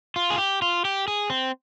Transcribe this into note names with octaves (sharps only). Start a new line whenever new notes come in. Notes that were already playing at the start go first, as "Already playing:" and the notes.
F4
G#4
G4
F4
G4
G#4
C4